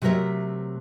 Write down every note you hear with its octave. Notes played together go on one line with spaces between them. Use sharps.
C3 F#3 A3 A#4 C#5 E5